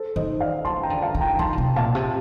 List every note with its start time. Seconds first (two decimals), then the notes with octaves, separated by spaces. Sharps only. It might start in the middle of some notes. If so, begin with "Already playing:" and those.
Already playing: A4 C5
0.16 D#3 C5 D#5
0.41 D5 F5
0.65 D#3 A5 C6
0.83 G5 A#5
0.90 D3
1.02 F5 A5
1.15 D#3
1.20 G5 A#5
1.39 D#3 A5 C6
1.53 D3
1.58 C3
1.76 A#2 F5 A5
1.95 C3